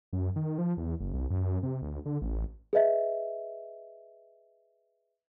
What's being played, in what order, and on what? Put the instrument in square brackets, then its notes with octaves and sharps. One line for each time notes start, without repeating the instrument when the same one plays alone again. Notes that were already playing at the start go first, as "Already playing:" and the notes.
[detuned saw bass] F#2
D#3
F3
E2
F#1
C2
F#2
C3
D2
D3
A1
[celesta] G#4 B4 D#5 E5